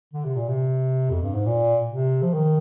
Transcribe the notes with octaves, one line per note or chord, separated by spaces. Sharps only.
D3
C3
A#2
C3
F2
G2
G#2
A#2
C3
F3
D#3